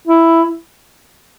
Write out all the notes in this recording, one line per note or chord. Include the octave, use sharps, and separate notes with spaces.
E4